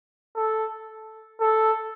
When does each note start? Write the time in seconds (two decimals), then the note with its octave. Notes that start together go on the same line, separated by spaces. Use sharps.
0.36 A4
1.40 A4